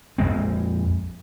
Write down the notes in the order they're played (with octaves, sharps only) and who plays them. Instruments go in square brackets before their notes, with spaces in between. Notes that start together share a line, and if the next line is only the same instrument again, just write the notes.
[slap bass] A#1 F2 G#3 C4